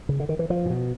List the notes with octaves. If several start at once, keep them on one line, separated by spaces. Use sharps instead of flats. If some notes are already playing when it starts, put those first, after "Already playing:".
C#3
D3
D#3
E3
F3
A#2
B2